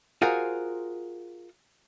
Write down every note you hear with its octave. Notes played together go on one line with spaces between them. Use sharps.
F4 F#4 G#4 A#4 C5 F#5